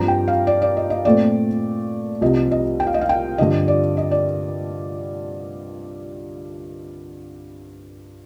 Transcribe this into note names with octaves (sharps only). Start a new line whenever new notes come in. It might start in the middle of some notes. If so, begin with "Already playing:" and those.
Already playing: G2 F3 C4 A#5
G5
F5
D5
D5
D#5
D#5
A#2 A3 C4 D5
C2 C3 F3 D#5
D#5
G5
F5
D#5
F5
G5
G2 D3 F3 D#5
D5
D#5
D5